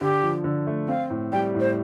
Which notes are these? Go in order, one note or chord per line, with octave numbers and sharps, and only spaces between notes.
D3 G4
F3
D3
A3
C4 F5
A2
G3 G5
A2
C5